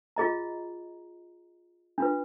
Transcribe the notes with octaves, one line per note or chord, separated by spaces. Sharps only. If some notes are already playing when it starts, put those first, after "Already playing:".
F4 G#4 D#5 A#5
D4 F4 B4